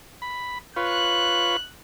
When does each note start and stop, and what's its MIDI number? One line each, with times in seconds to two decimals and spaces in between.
0.22 0.58 83
0.76 1.57 65
0.76 1.57 71
0.76 1.57 73
0.76 1.75 90